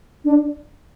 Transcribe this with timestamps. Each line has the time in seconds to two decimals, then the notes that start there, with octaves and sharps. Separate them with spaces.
0.25 D4